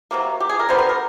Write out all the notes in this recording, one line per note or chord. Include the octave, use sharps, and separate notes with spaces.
C3 D#3 F#3 A#3
G4
G#4
A#4
D3 G3 B3 C5
A#4
A#4